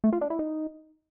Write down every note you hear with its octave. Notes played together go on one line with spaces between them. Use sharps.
A3
F4
D4
E4
D#4